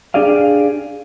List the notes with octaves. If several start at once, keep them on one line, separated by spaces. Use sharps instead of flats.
D4 G4 G#4 D5 F5